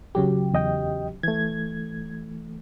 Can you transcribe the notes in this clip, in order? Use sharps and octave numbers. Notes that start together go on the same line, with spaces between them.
C#3 F#3 G4
E2 D#5 G5
E3 A3 G#6